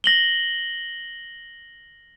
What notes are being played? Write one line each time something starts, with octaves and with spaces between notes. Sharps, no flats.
A#6 F#7 G7